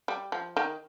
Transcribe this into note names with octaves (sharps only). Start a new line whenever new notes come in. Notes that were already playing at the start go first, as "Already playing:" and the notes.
G3
F3
D#3